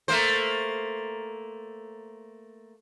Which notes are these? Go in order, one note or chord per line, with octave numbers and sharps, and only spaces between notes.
A3 A#3 C5